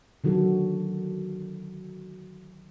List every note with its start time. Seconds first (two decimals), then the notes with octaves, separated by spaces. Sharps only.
0.24 D3 D#3 F#3 F#4 A4